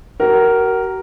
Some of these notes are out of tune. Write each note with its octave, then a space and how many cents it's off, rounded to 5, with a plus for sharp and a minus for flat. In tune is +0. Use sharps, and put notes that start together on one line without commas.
F#4 +40 A#4 +0